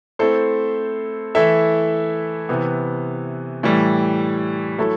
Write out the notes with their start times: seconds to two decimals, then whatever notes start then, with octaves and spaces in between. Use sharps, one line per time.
0.19 A3 C4 E4 A4 C5
1.35 E3 A3 E4 A4 E5
2.49 C3 E3 B3
3.63 A2 E3 G3
4.78 F#3 A3 E4 A4